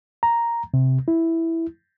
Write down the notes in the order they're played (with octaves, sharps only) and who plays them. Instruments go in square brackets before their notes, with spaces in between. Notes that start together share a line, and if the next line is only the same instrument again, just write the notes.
[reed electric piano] A#5
C3
E4